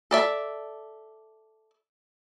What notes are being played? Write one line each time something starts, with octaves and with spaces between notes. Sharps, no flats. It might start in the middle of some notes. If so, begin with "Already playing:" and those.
A4 D5 E5